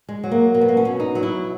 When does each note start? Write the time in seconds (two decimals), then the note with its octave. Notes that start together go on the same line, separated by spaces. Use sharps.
0.09 G#3
0.24 F#3
0.31 A#3
0.54 B2 A#3
0.61 B3
0.69 A#3
0.77 C#4
0.85 B2
1.00 D#4
1.15 F#3
1.23 E4